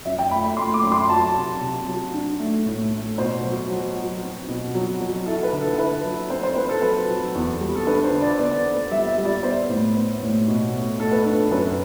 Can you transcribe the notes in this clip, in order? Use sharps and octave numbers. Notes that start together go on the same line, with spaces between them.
F#2 E5
G5
A3 B5
B5
A3 C6
D6
F#2
C6
F#3 A5
C3
C3
F#3
D4
A3
A2
A3
B2 C5
F#3
F#3
F#3
C4
B2
F#3
F#3
E4 A4
B4
D3
A4
E4 B4
F#3
C4 C5
C5
C4 B4
A4
F#3 B4
F#3
E2
G3
A4
D4 B4
C5
D3
D5
B3 D5
B3
G3 E5
E5
G3
D5
B3 C5
A2
B3
A2
B2
A3
A3 A4
B4
D4 A4
F#2 B4